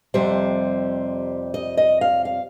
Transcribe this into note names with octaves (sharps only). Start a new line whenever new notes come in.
F2 C3 G3 C5
D#5
D#5
F5
F5